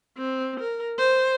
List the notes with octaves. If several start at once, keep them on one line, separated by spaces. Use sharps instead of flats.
C4
A#4
C5